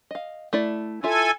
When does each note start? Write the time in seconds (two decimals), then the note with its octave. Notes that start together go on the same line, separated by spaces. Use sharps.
0.11 D#5 F5
0.53 A3 E4 D5
1.03 E4 F4 A4 E5 G#5